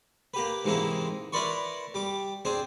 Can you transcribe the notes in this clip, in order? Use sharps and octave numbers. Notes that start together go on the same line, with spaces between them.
A#3 G4 B4
G#2 C3 E3 G#3 A#3 C4
E4 A#4 B4 D5 C6 C#6
G3 D6
C4 D4 G#4 C5